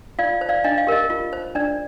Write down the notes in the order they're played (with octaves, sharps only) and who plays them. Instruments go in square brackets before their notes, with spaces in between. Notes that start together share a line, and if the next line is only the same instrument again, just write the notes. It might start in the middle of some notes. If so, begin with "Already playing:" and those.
[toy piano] F4 D5 F5
C5
D5 F5
D4 D#5
F5
G4 A#4 D#5
F4
C5
D4 D5